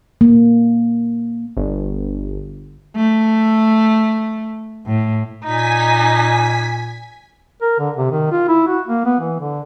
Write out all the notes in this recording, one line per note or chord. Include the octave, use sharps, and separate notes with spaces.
A#3
G1
A3
A2
A#2 D#4 G#5 B6
A#4
D3
C3
D#3
F4
E4
F#4
A#3
B3
E3
D3